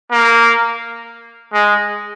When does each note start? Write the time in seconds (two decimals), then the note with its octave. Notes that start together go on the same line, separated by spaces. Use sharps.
0.11 A#3
1.53 G#3